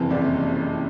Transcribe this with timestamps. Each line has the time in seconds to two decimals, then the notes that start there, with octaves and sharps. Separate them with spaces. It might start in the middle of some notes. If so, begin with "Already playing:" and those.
Already playing: F#1 F2 C3 E3
0.11 F#1 F2 C3 E3 D5